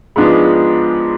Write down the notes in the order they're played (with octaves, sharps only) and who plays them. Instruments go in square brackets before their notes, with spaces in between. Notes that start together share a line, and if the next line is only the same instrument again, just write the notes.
[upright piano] G#2 F3 G#3 B3 D4